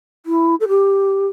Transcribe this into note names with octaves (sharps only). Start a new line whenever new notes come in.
E4
A4
G4